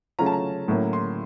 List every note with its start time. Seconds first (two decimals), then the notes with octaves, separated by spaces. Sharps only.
0.19 C#3 F#3 A3 C#4 F4 A#5
0.26 A5
0.32 A#5
0.68 A2 F#3 A#3 C#4
0.93 C6